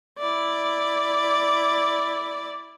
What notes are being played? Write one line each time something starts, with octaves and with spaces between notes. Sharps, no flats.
E4 D5